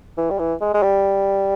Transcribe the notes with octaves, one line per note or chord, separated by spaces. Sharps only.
E3
G3
E3
G#3
G#3
G3